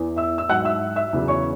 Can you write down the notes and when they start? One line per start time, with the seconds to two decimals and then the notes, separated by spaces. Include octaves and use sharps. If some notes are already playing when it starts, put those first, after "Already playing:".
Already playing: E2 E3
0.16 E5 E6
0.38 E6
0.49 G#2 F#3 F#5 F#6
0.65 E5 E6
0.96 E5 E6
1.13 E2 C#3 F#3
1.28 C#5 C#6